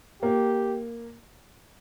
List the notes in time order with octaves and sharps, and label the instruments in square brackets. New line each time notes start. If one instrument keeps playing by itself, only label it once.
[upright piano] A#3 [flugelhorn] G4